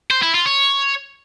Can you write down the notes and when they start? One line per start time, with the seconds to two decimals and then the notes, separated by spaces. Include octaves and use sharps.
0.11 C5
0.22 E4
0.34 F4
0.46 C#5